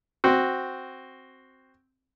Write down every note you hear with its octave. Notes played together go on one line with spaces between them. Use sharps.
C4 F#4